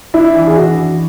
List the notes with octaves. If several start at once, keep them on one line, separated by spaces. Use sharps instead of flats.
D4 E4
E3
G#4
D4 F#4
E3